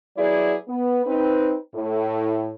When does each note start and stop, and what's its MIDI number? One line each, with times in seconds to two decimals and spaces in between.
0.16 0.56 54
0.16 0.56 59
0.16 0.56 64
0.16 0.56 68
0.16 0.56 74
0.68 1.01 59
1.06 1.54 60
1.06 1.54 63
1.06 1.54 71
1.74 2.53 45